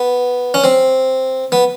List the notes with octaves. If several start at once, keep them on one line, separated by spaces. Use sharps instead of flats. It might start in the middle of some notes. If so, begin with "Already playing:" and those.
Already playing: B3
C#4
C4
B3